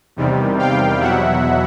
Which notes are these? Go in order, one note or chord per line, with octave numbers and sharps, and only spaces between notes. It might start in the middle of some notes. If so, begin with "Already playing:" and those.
E2 C3 D#3 G3
F5 G5
E2 B2 F#3 E5 F#5